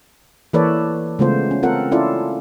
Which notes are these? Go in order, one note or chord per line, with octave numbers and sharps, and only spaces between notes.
E3 A#3 A4 B4 C#5 D5
C#3 G#3 A3 B3 F4 C5
C#4
C4 F4 A4 A#4 F#5
C#4 E4 F4 A4 D5